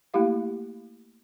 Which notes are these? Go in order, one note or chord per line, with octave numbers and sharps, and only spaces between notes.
A3 A#3 E4 G4 F5